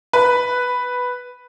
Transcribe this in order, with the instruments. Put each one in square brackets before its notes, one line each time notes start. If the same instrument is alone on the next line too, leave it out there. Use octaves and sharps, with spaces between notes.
[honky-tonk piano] B4